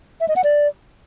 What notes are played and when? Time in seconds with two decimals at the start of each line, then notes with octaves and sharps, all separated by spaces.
0.21 E5
0.28 D#5
0.36 F#5
0.44 D5